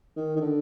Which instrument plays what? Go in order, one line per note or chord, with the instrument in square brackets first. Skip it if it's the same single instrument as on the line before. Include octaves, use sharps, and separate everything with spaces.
[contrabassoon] D#3
D#3
D3